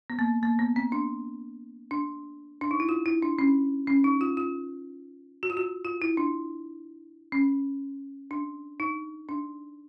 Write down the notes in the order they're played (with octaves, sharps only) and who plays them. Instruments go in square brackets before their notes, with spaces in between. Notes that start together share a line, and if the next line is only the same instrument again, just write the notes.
[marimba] B3
A#3
A#3
B3
C4
D4
D4
D4
D#4
E4
F4
E4
D4
C#4
C#4
D#4
F4
F4
F#4
F4
F#4
F4
E4
D4
C#4
D4
D#4
D4